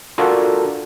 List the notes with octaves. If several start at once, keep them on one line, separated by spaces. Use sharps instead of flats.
D4 F4 F#4 A4 A#4